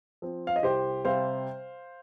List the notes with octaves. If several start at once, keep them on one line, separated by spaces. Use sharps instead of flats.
F3 C4
F5
D#5
C2 G4 C5
C3 G3 C4 C5 F5